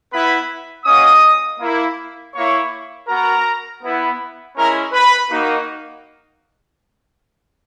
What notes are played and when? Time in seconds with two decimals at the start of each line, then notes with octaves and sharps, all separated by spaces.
0.11 B3 E4 B4 B5
0.85 A#3 C#4 F#4 D#5 D#6
1.60 A#3 E4
2.33 A#3 E4 C#5 C#6
3.07 B3 F#4 A#4 A#5
3.83 B3 E4
4.56 G#3 C#4 E4 A#4 A#5
4.93 B4 B5
5.30 A#3 D#4 F#4